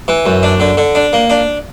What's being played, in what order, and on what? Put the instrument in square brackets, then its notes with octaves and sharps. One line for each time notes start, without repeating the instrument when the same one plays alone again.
[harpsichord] E3
F#2
D4
D3
D3
D4
A#3
D4